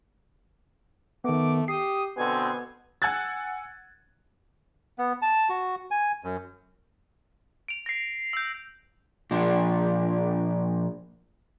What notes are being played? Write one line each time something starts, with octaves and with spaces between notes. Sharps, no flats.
D#3 A3 B3 D6
G4 D#6 C7
B2 D3 B3 C4 G#5
F#5 G#5 E6 F#6 G#6 A6
B3
A5
F#4
G#5
F#2
D7 F7
A#6 C7
E6 G6
A#2 F3 D4